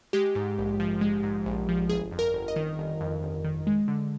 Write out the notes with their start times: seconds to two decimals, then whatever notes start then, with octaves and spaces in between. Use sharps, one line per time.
0.13 G#3 G4
0.35 G#2
0.58 A#1
0.80 F3
1.01 G#3
1.23 G#2
1.46 A#1
1.69 F3
1.89 G1 G#4
2.11 F2
2.19 A#4
2.34 G1
2.48 D#5
2.56 D#3
2.79 G1
3.01 F2
3.22 G1
3.44 D#3
3.67 G#3
3.88 D3